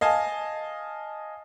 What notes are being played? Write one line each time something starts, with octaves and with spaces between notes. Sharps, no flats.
D#5 F5 G#5 A5